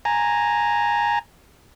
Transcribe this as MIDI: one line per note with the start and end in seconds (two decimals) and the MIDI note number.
0.05 1.19 80
0.05 1.19 82